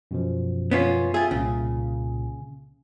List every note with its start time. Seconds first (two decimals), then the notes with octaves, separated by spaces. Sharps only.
0.11 F#2 B2 F3
0.71 B3 C#4 F4
1.14 F4 G#4 E5 G5
1.31 C2 A#2 C#3